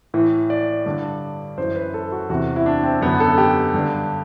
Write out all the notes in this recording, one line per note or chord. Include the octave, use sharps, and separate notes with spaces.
A2 E3
D5
G2 D3 D5
F#2 E3 C5
B4
A4
F#4
E2 C3 E3 F#4
E4
D4
C4
F#2 D3 B3
A4
G4
G2 D3